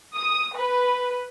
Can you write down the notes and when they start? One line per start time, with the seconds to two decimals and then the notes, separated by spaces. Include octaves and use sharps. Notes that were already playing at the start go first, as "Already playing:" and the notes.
0.15 D#6
0.57 B4